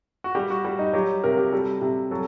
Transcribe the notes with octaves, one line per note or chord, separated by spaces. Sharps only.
F#4
G3 G4
F#4
G3
D#4
F#3 G4
C3 A#4
G4
G3 A4
C3
F#3 A4